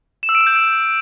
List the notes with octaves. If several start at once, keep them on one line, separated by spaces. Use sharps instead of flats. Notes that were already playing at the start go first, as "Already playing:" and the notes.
E7
E6
D7
E6
G6